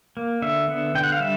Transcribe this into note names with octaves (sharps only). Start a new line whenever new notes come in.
A#3
D3 E5
B3
D3 G5
F#5
F5
G3 E5